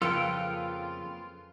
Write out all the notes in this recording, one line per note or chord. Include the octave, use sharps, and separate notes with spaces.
F2 C#3 F3 A#3 F4 A4 B4 G5